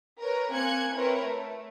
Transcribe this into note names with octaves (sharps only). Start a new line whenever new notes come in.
A#4 B4 C#5
A#3 C4 G#5 F#6 G#6 C#7
C4 E4 A#4 B4 C#5
A3